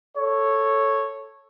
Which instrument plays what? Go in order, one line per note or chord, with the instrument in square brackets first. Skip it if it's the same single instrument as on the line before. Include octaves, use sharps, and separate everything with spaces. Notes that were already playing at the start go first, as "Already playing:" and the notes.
[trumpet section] A4 C#5